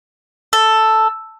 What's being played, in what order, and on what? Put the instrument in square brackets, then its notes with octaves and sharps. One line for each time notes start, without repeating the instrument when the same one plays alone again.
[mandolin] A4